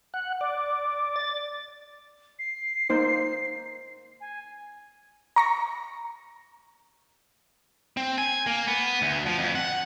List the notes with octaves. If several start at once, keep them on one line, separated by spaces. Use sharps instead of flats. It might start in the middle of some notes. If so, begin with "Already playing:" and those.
F#5
D5
A6
C7
A#3 D#4 C5
G#5
A#5 C#6 A#6
C4
G#5
A#3
B3
D2
F3
F2
F#5